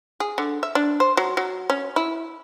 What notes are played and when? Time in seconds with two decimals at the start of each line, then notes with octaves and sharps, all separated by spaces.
0.20 G#4
0.38 D3
0.63 E5
0.75 D4
1.00 C5
1.17 F#3
1.37 F#3
1.70 C#4
1.96 E4